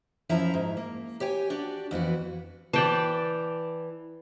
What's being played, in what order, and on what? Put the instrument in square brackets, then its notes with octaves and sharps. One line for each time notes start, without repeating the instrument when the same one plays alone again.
[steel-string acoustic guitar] F#2 F3 E4 E5 G#5 A#5
G#2
A#3
G4 C#5 G5 G#5
D4 F#4 G4 D5
F2 E3 B3 F#4
[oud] E3 [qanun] D5 G5 A5